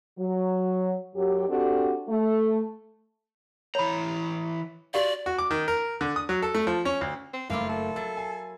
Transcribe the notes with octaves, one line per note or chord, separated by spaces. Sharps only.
F#3
F#2 F#3 G4
C4 D4 F#4 G4 A4
A3
E3 C#5 A#5 B5
F#4 G4 D5 F5
F#4
D6
D#3
A#4
D3
D#6
F#3
A4
A3
F3
C#4
D2
C4
F#1 A3 A#3 E4 F4 F5 D6
A4
F#3 E6 A6
G#5 C7